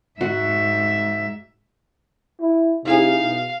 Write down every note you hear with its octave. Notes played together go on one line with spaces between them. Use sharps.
G#2 F#4 E5
E4
C3 D#4 E4 G#4 F5
B2